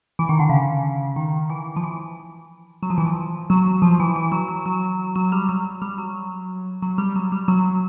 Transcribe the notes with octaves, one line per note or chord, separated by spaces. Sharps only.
E3
D#3
D3
C#3
D#3
E3
F3
E3
F#3
F3
E3
F3
F#3
F3
E3
E3
F#3
F#3
F#3
F#3
G3
F#3
G3
F#3
F#3
G3
F#3
G3
F#3